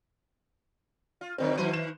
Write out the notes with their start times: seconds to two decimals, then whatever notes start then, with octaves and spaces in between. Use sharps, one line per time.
1.21 F4
1.38 B2 D3 F#3 C4
1.58 D#3 F#3 B4 C5 D#7
1.73 E7